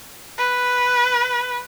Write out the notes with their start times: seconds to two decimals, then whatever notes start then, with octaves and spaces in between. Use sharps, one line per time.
0.38 B4